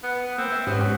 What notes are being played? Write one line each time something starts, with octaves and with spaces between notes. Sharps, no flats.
B3
A#3 C4
E5
G#2 B3 C#4 G4